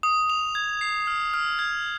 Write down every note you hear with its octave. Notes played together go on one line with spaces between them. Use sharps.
D#6
F7
G#6
C7
F6
F6
G#6